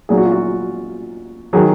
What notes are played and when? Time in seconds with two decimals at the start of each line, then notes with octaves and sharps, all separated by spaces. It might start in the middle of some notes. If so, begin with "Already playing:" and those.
0.09 A#2 F#3 G#4
0.17 F#4
0.25 F4
0.32 F#4
1.53 D#3 F#3 G#4